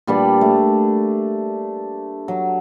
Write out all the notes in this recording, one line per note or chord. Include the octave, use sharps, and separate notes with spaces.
A#2 G3 D4 B4
A3
F#3